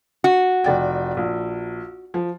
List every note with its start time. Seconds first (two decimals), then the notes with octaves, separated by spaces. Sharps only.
0.24 F#4
0.64 F1 D5 G5
1.17 A#1
2.14 F3